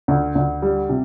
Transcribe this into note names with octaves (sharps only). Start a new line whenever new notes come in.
D2
D2
G3
C3